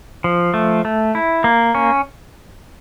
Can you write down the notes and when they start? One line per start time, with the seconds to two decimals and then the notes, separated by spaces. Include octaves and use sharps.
0.24 F3
0.54 A3
0.85 A3
1.15 E4
1.44 A#3
1.75 C#4